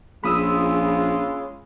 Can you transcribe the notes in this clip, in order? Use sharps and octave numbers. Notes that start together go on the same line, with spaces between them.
A#1 G#3 C#4 F4 B5 D#6 E6